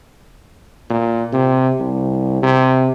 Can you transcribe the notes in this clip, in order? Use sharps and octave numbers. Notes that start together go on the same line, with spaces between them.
A#2
C3
C2
C3